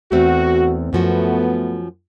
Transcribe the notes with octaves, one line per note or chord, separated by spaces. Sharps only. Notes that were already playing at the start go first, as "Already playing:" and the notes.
E2 A3 C4 F#4
F#2 F3 A3 B3 F#4